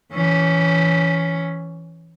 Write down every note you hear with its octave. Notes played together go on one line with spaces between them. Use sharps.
E3 C#4